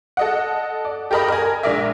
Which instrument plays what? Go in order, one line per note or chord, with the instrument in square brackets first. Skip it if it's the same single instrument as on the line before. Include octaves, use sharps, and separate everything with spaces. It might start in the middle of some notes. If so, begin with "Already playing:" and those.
[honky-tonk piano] A4 D#5 F#5
D5
G4 A4 A#4 D#5 B5
A#4 G#5
A#1 G#3 A#4 D5 E5